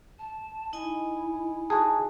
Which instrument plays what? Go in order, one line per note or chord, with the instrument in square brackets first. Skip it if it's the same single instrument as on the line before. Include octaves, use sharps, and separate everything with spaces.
[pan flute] A5
[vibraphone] D#4 D#5 G#5 [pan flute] E4
[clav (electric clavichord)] F#4 G#4 [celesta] A5